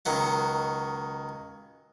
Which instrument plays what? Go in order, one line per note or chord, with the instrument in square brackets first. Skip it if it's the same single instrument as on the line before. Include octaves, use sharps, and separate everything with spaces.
[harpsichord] C#2 D#3 F#3 F#5